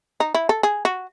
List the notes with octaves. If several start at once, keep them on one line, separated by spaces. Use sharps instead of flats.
D#4
E4
A4
G#4
F#4